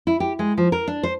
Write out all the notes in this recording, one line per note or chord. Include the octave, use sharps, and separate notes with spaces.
E4
G4
G#3
F3
A#4
D4
C5